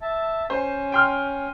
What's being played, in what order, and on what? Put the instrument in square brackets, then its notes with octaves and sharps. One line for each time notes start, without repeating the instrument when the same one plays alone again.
[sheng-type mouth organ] E5 A5
[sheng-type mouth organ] C#4 [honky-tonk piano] C5
[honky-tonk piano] G5 C6 F6